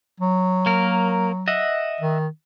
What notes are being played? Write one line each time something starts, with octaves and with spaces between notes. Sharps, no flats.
F#3
A#3 A#4
D#5 E5 F#5
D#3